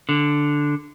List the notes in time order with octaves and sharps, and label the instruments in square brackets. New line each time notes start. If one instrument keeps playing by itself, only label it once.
[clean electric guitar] D3